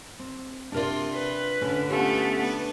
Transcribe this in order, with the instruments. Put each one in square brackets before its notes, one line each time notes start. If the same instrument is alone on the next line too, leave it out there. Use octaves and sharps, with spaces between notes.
[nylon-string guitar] C4
[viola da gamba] C3 F4 [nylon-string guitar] D4 A#4 D5
[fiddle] B4
[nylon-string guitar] A2 C#4 A4 [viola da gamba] D3
[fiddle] A3 B3 [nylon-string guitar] C#4 F4 G4
[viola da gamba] B3 D4 B4